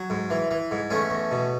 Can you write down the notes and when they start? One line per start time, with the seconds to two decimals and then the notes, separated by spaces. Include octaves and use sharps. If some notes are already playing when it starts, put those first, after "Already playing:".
Already playing: F#3
0.10 G#2
0.30 E3
0.51 E3
0.71 G#2
0.90 E2 A3 C#4
1.10 E2
1.31 B2